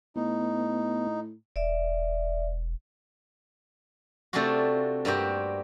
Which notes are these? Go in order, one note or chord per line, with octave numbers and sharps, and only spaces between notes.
A2 B3 D#4
E1 D5 E5
C3 A3 C4 D4 F4 F#4
G2 A#3 C4 F#4 G4